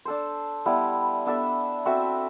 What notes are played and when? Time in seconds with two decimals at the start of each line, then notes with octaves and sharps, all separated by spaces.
0.05 D4 A4 C5
0.66 G3 B3 E4
1.26 B3 D4 A4 E5
1.85 C4 F#4 A4 E5